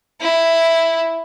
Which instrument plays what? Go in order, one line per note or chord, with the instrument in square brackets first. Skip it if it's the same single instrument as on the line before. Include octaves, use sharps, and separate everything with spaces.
[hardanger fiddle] E4